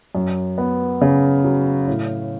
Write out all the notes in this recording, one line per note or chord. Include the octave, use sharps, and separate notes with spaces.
F#2
B3
C#3
F#3
A2